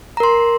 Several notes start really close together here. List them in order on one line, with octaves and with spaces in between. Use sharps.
A#5 A#4 C6